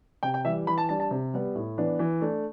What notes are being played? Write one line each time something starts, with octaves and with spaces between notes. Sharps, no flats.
C3 G5
G5
E3 G3 E5
E3 B5
A5
G3 D4 A5
A5
C3
G3 B3
A2
E3 B3 D4
E3
A3 D4